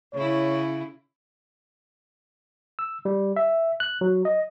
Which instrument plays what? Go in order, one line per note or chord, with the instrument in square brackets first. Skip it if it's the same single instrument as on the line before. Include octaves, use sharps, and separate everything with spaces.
[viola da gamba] C#3 E4 [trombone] C#5
[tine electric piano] E6
G3
E5
F#6
F#3
D#5